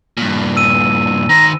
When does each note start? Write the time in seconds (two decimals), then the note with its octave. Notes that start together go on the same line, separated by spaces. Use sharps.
0.17 G2 A#2
0.57 E6 D#7
1.29 D#3 C5 A#5